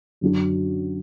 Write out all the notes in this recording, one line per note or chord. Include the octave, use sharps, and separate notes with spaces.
F#2 D3 F#3 D4 F#4